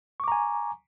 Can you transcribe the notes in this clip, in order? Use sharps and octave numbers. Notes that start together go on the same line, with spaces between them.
G#5 A#5 C#6 D6